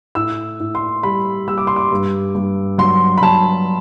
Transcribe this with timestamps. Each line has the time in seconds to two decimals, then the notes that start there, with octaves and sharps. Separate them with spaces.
0.15 A2 E6
0.60 A2
0.75 C6
1.03 G3 B5
1.48 G3 E6
1.58 D6
1.67 C6
1.76 D6
1.92 G2
2.35 G2
2.78 F#3 C6
3.17 B5
3.22 F#3 A5